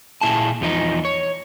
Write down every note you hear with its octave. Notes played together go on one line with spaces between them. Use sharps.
A#2 E4 G#4 A5
E2 F3 D#4
C#5